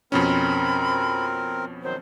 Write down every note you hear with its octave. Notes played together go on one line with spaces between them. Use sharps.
F2 B2 C4 C#4 A#4 B5
D#3 F#3 C5